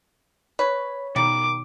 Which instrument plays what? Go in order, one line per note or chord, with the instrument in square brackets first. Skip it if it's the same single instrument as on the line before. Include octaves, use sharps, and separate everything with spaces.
[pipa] B4 [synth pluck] C#5
[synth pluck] B2 D#3 [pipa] G3 A#3 [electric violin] D6